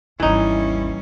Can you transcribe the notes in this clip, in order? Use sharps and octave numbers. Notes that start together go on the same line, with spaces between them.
G#1 D#2 E3 G3 C#4 D#4 E4